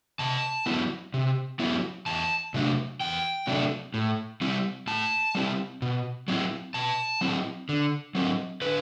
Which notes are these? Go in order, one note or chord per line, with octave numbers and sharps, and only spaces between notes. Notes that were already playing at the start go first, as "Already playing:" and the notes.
C3 A5
F#3 B3 E4
C3
F#3 B3 E4
E2 A5
C3 F#3 A3 D4
E2 G5
C3 F#3 A3 D4
A2
G3 C4 E4
A2 A5
G3 C4 E4
B2
F#3 C4 E4
B2 A5
F#3 C4 E4
D3
F#3 C4
D3 B4